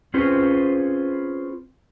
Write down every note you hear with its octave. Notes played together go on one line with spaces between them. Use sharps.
C4 C#4 F4 G#4 B4 C5